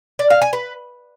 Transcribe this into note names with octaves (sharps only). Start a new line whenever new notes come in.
D5
F5
G#5
B4